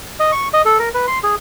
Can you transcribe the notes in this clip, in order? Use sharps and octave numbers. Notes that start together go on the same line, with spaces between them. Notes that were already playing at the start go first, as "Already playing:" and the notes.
D#5
C#6
D#5
A4
A#4
B4
C6
G#4